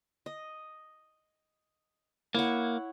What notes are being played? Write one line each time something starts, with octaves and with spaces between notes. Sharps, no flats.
D#5
A#3 E4 C#5 F#5